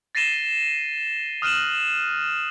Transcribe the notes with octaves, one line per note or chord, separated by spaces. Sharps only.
A6 A#6 C7 D#7 E7 G7
D#6 F6 F#6 D#7 E7 F#7